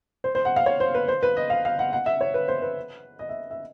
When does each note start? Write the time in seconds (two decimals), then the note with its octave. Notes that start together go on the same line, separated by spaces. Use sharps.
0.24 C5
0.35 C5
0.45 F#5
0.56 F5
0.66 C#5
0.80 C5
0.95 B4
1.08 C5
1.23 B4
1.37 D#5
1.50 F5
1.65 F5
1.79 F#5
1.93 F#5
2.06 E5
2.21 C#5
2.34 B4
2.48 C5
2.62 B4
3.19 D#5
3.29 E5
3.51 E5